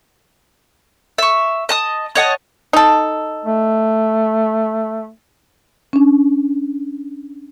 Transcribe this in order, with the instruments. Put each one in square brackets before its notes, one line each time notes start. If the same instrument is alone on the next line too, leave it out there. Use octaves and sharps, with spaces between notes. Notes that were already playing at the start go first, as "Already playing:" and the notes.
[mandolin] E5 C#6
D#5 A5 D#6
C#5 D#5 F#5 A5
[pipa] D#4 A4
[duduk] A3
[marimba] C#4 D4